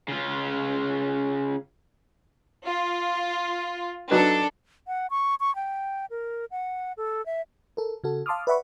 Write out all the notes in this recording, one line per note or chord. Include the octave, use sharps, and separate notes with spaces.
C#3 F4
F4
F#3 D4 D#4 A4 B4
F#5
C#6
C#6
G5
A#4
F#5
A4
E5
A4 A#4
C#3 F#4 A4
F5 A5 C6 D6 D#6 F6
B4 D5 E5 F#5 B5 C#6